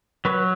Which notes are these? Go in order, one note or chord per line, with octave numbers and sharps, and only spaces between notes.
F#3 B4